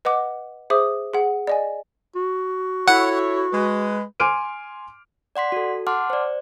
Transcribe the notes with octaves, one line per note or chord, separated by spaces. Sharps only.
B4 D#5 F#5 D6
G#4 C5 E5 D6 D#6
G#4 F#5
D5 D#5 G#5
F#4
E4 A4 C#5 F#5
G#3 B4
G#5 C6 D6 F6 D7 D#7
D5 F#5 C6 B6
F#4 A4
F#5 A5 C6 D6 F6
C5 D5